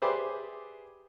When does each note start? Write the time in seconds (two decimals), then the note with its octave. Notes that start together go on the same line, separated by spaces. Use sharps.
0.02 G4 G#4 B4 C5 D5 E5